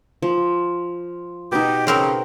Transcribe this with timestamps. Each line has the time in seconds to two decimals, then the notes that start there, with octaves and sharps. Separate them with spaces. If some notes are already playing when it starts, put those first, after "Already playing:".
0.22 F3
1.52 B2 D#4 G4
1.87 C#3 C4 A#4 C5